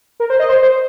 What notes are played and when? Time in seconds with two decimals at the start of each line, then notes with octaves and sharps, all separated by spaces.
0.20 A#4
0.30 C5
0.40 D#5
0.49 C5
0.62 C5